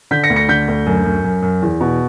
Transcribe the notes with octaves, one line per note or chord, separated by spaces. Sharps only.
D3 G6 B6
A#6 C#7
D2
A#6 C#7
D3 G6 B6
D2
F#2
F#2
F#2
F#2
E2
B2